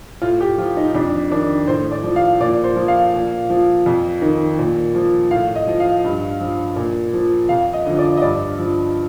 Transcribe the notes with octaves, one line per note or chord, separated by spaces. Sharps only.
A2 F4
G4
F3 F4
D#4
F2 D4
D#3 D4
A2 C5
D5
F3
F5
A#2 D5
C5
F3
F5
A#2
F3
F2
D#3
A#2
F3
A2 F5
D#5
F3
F5
G2
F3
A#2
F3
F2 F5
D#5
D3 F3
D5
D#5
G2 D5
F3